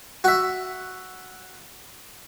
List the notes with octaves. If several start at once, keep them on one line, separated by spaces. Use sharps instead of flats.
F#4 E5